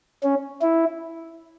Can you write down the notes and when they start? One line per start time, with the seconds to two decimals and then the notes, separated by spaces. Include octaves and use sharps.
0.23 C#4
0.62 E4